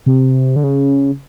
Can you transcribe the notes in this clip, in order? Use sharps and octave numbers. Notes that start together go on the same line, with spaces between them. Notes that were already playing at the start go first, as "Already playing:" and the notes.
C3
D3
C#3